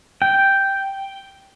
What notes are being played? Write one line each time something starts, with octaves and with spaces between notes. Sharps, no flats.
G5